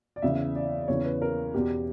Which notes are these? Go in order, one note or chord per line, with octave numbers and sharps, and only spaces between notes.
D5
E2 C#3 E3 E5
D5
E2 C#3 E3 C#5
B4
A#4
E2 B2 G4